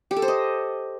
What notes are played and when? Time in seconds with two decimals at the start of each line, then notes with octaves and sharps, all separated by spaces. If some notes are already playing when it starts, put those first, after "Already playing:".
0.11 G4
0.17 A4
0.22 C5
0.28 D#5